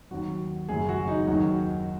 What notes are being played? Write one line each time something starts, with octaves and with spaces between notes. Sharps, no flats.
D#2 D#3 F#3 F#4
F#1 F#2 F#3 G#4
F#4
D#4
D#2 D#3 F#3 F#4